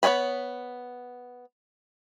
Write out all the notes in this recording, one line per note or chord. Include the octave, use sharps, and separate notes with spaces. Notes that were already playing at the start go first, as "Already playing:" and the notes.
B3 C#5 D#5 G#5 B5